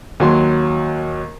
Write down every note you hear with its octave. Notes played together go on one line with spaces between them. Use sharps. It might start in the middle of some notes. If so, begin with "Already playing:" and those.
D#2 F#3 C6